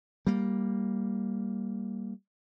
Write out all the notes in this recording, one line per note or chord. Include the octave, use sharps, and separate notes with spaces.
G3 A#3